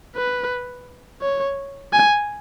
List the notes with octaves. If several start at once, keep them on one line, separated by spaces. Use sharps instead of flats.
B4
C#5
G#5